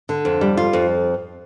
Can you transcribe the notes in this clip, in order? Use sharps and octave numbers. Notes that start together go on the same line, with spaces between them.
D3
F2
G3
F4
F2